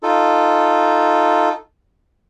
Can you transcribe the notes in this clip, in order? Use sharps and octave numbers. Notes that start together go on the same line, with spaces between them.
D#4 F4 A4